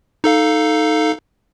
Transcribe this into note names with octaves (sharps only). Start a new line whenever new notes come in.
D#4 A4 F5